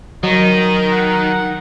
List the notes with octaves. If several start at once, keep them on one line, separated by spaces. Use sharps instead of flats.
D#3 F#3 A#4 D#5 A#5
F#5